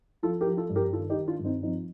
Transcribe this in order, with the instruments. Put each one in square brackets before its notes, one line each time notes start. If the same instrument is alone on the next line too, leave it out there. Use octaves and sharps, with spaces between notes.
[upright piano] F3 F4 A4
G4 A#4
F3
F4 A4
G2
G4 A#4
D#3 F4 A4
D#4 G4
D#3
D4 F4
G2
C4 D#4
F3 C4 D#4